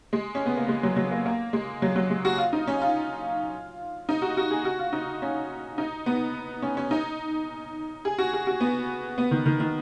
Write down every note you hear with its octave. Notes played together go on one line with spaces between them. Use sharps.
G#3
C#4
B3
A#3
G#3
F#3
F#3
A#3
A#3
G#3
F#3
F#3
G#3
F#4
F4
D#4
C#4
F4
D#4
F#4
F#4
G#4
F#4
F4
D#4
C#4
D#4
B3
C#4
C#4
D#4
G#4
F#4
G#4
F#4
B3
B3
D#3
D#3
D#3